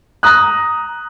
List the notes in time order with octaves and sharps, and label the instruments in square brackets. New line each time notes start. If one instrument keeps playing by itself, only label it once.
[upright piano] A#5 D#6 F#6